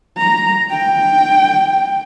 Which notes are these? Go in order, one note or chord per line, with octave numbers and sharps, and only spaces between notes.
A#5
G5